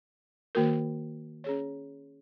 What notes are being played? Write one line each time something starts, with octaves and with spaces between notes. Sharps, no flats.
D#3 A#3 F#4 A#4
C#4 G#4 C#5